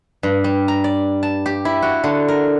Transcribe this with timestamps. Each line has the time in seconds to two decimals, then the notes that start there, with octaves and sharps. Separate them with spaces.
0.23 G2
0.44 G3
0.68 A#5
0.84 D5
1.23 A5
1.46 G4
1.65 E4
1.82 F#4
2.04 D3
2.28 A#4